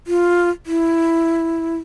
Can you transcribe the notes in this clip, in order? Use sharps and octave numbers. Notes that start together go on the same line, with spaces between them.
F4
E4